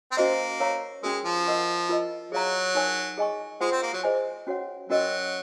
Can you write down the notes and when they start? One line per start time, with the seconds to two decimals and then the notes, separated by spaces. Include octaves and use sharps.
0.12 C4
0.17 A#3 C#4 F#4 C5 D#5
0.60 A#4 C#5 F5 A#5 C#6
1.03 G#3 C#4 F#4 A#4
1.24 F3
1.46 A#4 D#5 F#5 C#6
1.89 F4 A#4 D#5
2.32 F#3 G#4 C#5 F5 A#5
2.75 D#4 A#4 C#5 G#5 C#6
3.18 G#4 D#5 G#5 C#6
3.61 G#3 F4 C5 F#5 C6
3.72 C4
3.82 A#3
3.93 F#3
4.03 G#4 C5 D#5 G#5
4.47 C#4 F#4 C#5 F#5
4.90 F#3 C#4 F#4 A#4 D#5